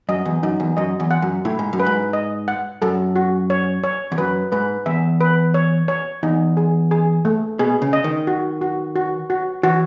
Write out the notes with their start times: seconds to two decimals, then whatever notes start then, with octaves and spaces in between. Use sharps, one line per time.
0.09 F#2 D#5
0.25 E2
0.43 F#2 D#4
0.60 E2
0.77 F#2 D#5
1.00 E2
1.11 F#5
1.22 F#2
1.45 A2 E4
1.59 G#2
1.73 F#2
1.80 B4
1.86 G#2
2.13 D#5
2.48 F#5
2.82 F#2 A4
3.16 F#4
3.50 C#5
3.84 C#5
4.12 E2
4.18 F#2 B4
4.52 G#2 B4
4.86 E2 E5
5.21 B4
5.54 C#5
5.88 C#5
6.23 E2 D#4
6.57 G#4
6.91 G#4
7.25 A3
7.59 B2 G#4
7.82 C#3
7.93 D#5
8.04 D#3
8.27 F#4
8.61 F#4
8.96 F#4
9.30 F#4
9.63 E3 F#4